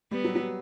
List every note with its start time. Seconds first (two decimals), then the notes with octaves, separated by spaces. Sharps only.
0.11 G3 B3
0.24 F#3
0.35 F#3